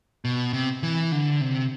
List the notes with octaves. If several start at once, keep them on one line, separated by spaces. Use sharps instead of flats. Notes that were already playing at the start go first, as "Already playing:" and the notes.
B2
C3
E3
D3
C3